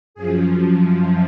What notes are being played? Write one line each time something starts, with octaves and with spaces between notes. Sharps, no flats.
F#2 F3 G#4